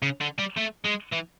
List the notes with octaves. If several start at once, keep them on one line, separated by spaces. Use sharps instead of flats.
C#3
D3
G3
A3
G#3
E3